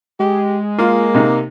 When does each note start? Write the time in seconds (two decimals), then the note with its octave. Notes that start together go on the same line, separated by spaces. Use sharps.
0.20 G#3 G4
0.79 A#3 F4
1.14 C3 D#4